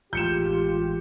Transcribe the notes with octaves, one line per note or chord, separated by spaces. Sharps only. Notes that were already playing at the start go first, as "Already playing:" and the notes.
A1 A2 G#3 F4 G4 G6 C#7 E7